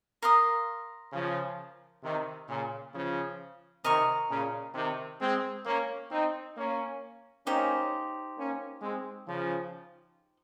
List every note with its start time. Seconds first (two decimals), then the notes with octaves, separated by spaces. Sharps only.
0.22 A#4 F5 C6 D#6
1.13 C#3 F3
2.03 C3 D#3
2.48 A#2 C#3
2.94 C#3 F3
3.84 C3 D#3 A#4 D#5 A#5 C#6
4.30 A#2 C#3
4.75 C3 D#3
5.21 G#3 C4
5.65 A#3 C#4
6.11 C4 D#4
6.56 A#3 C#4
7.46 A#3 C#4 D#4 G4 C5
8.37 A#3 C#4
8.82 G#3 C4
9.27 C#3 F3